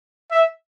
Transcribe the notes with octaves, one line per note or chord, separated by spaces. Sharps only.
E5